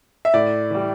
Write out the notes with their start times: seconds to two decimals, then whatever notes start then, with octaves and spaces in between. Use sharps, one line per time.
0.25 E5
0.34 A2 D5
0.70 E3 G3